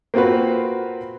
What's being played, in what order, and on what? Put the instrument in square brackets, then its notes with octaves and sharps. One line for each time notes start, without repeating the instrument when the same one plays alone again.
[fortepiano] A#3 C4 F4 F#4 B4